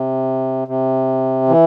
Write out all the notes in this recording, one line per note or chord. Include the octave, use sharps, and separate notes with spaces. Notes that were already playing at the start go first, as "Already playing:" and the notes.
Already playing: C3
C3
E3